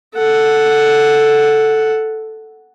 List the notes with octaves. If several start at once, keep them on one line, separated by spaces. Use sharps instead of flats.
A4 F#5